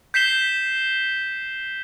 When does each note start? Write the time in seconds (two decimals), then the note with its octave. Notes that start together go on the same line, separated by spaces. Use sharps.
0.14 G6 B6 C7 E7 G7